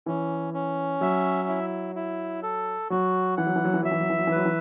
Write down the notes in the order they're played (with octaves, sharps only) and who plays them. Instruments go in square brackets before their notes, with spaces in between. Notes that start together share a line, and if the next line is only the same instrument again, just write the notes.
[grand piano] E3 [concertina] C#4
[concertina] C#4
[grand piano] F#3 [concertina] E5
[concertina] E4
E4
A4
[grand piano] F#3 [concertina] F#4
[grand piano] E3 [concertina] F#5
[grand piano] F#3
E3
F#3
E3
[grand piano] F#3 [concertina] E5
[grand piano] E3
F#3
E3
F#3
E3
[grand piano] F#3 [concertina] B4
[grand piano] E3